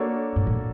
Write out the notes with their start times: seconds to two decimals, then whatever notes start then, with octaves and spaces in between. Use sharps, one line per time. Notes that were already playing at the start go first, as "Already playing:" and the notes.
Already playing: A#3 D4 F#4 A4 C#5
0.36 G#2
0.47 A2